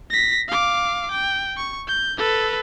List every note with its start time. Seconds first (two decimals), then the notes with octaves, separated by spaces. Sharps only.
0.10 A#6 B6
0.48 F5 D6
1.12 G5
1.57 C#6
1.88 G6
2.18 A4 B4